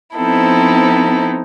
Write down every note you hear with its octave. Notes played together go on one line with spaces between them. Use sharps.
F3 B3 C4 D#4 E4 A4